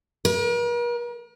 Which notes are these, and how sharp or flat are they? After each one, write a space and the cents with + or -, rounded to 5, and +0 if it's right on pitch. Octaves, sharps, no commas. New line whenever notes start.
A#4 +45